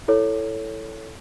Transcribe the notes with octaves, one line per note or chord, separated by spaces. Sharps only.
E4 A4 C#5